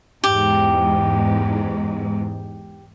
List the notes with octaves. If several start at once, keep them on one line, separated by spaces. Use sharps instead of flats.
E2 G#2 G4